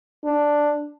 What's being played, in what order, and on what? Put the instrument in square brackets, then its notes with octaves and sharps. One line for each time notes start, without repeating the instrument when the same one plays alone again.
[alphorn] D4